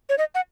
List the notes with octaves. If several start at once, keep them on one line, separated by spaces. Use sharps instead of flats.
C#5
D#5
F#5